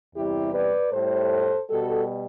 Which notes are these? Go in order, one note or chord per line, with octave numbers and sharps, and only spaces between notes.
E2 C3 G3 E4 G4
B4 D5
A2 G3 A4 C5
B2 G3 F#4 A4